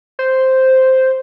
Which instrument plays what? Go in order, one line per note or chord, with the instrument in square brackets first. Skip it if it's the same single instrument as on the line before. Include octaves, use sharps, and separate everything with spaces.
[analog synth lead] C5